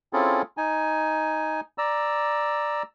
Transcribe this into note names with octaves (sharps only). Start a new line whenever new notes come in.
C4 C#4 E4 F4 G#4 A4
D#4 G#5
D5 A#5 E6